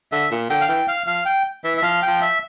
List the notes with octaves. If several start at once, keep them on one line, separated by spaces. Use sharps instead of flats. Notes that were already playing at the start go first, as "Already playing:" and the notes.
D3 E5
A#2
D3 G5
F5
E3 G5
F5
F3 F5
G5
E3 E5
E5
F3 F5
G5
F3
E5